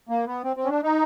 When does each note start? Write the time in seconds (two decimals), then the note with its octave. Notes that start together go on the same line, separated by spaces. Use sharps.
0.09 A#3
0.27 B3
0.44 C4
0.56 C4
0.65 C#4
0.69 D4
0.83 D#4